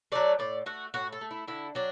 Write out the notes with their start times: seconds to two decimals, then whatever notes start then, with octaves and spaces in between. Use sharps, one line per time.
0.12 F#3 A3 D5
0.39 A2 D5
0.66 A3 F#4
0.94 A2 F#4
1.12 A4
1.21 A3
1.31 E4
1.48 D3 E4
1.75 F#3 D4